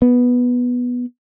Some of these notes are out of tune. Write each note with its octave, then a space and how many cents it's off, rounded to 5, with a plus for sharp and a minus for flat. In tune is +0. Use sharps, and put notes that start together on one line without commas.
B3 -5